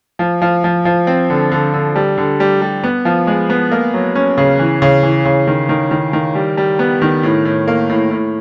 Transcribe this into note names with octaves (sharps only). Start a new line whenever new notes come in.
F3
F3
F3
F3
C4
D3
D3
D3
G3
D3
G3
G3
B3
F3
G#3
B3
A#3
F#3
C#4
C#3
E3
C#3
E3
C#3
D#3
D#3
D#3
D#3
G3
G3
B3
D#3
A2
A2
A#3
A2
A2